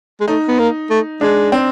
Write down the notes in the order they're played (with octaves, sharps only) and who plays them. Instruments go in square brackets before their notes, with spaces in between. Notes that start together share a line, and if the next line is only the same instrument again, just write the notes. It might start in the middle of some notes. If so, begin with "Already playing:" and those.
[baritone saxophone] G#3
[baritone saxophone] A3 [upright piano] D#4
[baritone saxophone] B3
A#3
A3
[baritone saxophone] G#3 [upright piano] D4
[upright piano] C4